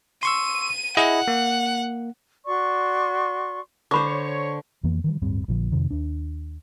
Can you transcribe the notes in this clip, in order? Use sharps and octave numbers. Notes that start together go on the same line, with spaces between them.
C6 C#6 E6 D#7
E4 G#4 D#5 F#5
A#3
F#4 D5 C6 C#6
D3 C5 B5 C#6 D6
C#5
F2 E3 A#3 B3
D#3 E3 G3
D1 G2 G3 C4
A#1 A#2 D3 F3
F2 C3 D#3
D#2 D4